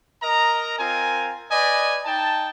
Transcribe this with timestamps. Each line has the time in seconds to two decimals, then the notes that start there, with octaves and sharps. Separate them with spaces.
0.23 A#4 D#5 A#5
0.79 C4 F4 A#4 G#5
1.51 B4 D5 D#5 G#5
2.06 D#4 G5 A5